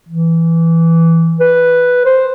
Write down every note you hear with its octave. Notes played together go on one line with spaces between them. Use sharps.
E3
B4
C5